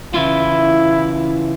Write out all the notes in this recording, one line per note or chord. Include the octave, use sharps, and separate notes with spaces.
C#3 E3 E4 F4